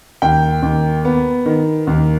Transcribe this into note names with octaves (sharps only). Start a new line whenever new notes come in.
D#2 G5
D#2
B3
D#3
D#2